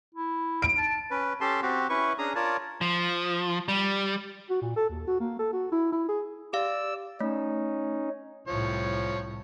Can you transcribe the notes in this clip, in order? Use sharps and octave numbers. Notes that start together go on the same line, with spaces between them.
E4
D7
A5
C#4 B4
C#4 G4 A4 A5 C6
C4 F#4 G4
C#4 E4 B4 C#6
C#4 D4 G#4 A#5 D#6
F4 A#4 C#5 D5 A5
F3
G3
F#4
A#2
A4
D#2
F#4
A#3
A4
F#4
E4
E4
G#4
G4 D5 F5 E6
A3 C#4 D#4
C2 A2 F3 C#5